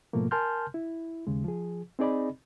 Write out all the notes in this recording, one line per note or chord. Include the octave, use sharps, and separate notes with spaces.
G#2 B2 F3 A3 A#3
A#4 G#5 A5 C6 F6 G6
E4
D#2 C#3 G#3
F3 G#4
C4 D#4 G#4 D5 D#5 B5